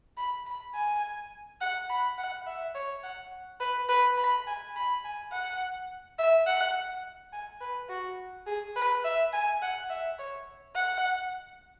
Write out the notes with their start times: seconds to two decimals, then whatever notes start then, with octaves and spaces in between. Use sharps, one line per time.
0.17 B5
0.46 B5
0.75 G#5
1.61 F#5
1.90 B5
2.18 F#5
2.46 E5
2.75 C#5
3.03 F#5
3.60 B4
3.89 B4
4.18 B5
4.47 G#5
4.76 B5
5.04 G#5
5.32 F#5
6.19 E5
6.46 F#5
7.33 G#5
7.61 B4
7.89 F#4
8.46 G#4
8.76 B4
9.04 E5
9.33 G#5
9.62 F#5
9.89 E5
10.18 C#5
10.75 F#5